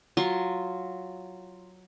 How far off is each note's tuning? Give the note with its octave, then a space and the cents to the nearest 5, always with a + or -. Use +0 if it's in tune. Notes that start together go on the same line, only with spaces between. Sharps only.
F#3 +0 F4 +0 C6 +30